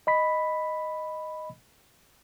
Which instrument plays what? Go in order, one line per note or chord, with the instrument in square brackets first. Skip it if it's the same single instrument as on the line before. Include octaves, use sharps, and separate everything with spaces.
[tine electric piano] D#5 B5 B6